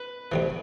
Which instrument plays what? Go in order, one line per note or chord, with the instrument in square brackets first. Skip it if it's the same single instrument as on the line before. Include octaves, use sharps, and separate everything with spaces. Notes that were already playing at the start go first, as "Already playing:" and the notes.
Already playing: [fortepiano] B4
[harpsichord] D2 C3 E3